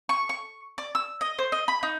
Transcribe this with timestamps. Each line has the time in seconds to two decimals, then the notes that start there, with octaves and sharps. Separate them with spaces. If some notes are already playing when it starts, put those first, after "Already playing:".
0.09 C#6
0.29 C#6
0.78 D5
0.95 E6
1.21 D#5
1.39 C5
1.52 D#5
1.68 B5
1.83 D#4